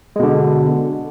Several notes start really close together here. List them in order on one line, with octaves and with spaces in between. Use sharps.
G#3 B2 D3